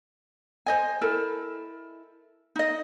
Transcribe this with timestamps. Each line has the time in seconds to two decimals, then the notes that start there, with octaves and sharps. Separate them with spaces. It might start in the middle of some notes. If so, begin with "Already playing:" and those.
0.66 C5 D#5 G#5
1.01 E4 A4 A#4
2.56 D#4 D#5